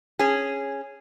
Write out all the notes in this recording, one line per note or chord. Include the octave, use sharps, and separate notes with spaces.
C#4 G#4